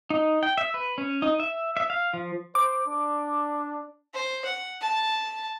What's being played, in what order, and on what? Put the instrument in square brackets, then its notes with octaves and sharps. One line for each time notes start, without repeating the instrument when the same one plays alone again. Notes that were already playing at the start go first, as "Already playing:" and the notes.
[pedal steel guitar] D#4
G5
E5
B4
C#4
D#4
E5
E5
F5
F3
[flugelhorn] C5 [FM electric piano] D6
[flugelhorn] D4
[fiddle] C5
F#5
A5